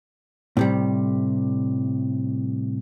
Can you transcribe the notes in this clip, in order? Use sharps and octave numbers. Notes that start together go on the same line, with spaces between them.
A2 C3 G3